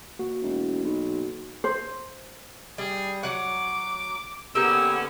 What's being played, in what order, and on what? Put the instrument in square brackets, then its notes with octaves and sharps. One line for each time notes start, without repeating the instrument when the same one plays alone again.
[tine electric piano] A#3 F#4
[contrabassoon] E1
B1
[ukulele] C5
[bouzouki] G3 [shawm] G#4
[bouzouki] F#3 F#5 [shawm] D6
[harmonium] D3 B3 [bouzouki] A#3 G4 [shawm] C#4 [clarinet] E6